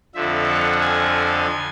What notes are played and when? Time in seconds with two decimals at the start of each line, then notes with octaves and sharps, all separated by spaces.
0.15 F2 D3 F3 E5
0.48 F#5
0.81 G#5